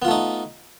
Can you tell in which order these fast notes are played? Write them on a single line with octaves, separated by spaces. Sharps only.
B3 F4 A3 D#4